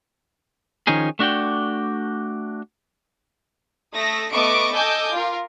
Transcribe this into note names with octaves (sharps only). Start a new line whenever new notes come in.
D#3 F3 C#4 D#4 G#4
A3 D4 F#4 D5 G5
A3 D#6 A#6
A3 B3 D#5 C#6 D6 D7
A4 D#5 G#5 D6 G6
F4 A#4